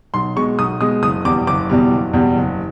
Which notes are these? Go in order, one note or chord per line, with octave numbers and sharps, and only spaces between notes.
B1 C6
B2 G#3 C#6
B1 D#6
B2 G#3 D#6
F#1 D#6
E2 B2 G3 D6
F#1 D6
E2 B2 G3
F#1
E2 B2 G3
F#1